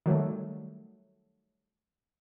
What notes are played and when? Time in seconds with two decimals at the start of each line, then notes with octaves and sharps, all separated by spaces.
0.06 D#3 F#3 G3 A3